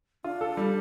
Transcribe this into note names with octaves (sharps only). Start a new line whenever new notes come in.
D4 F4
A4
G3